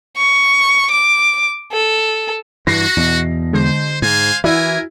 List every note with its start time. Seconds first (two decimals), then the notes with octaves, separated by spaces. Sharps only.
0.17 C#6
0.91 D6
1.73 A4
2.67 G2 E3 F#4 A#6 C7
2.97 E2 B2
3.53 D3 G#3 C5
4.02 G#2 C5 F5 G#5
4.44 E3 E4 F#4 A#4 G#5